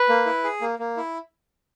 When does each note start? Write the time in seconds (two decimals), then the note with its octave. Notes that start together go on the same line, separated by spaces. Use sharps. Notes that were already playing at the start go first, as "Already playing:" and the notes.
Already playing: B4
0.09 A#3
0.26 E4
0.44 G#4
0.61 A#3
0.79 A#3
0.97 E4